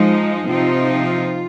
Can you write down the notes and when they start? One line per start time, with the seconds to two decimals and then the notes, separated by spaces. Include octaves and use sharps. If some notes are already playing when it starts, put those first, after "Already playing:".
Already playing: F3 G#3 D#4
0.46 C3 F3 C4 D#4 F4